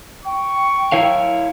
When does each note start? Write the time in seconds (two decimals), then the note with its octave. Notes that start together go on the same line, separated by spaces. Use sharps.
0.25 G5 C#6
0.92 E4 C#5 F5